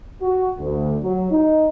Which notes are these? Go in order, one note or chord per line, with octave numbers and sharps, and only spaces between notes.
F#4
D2
F#3
D#4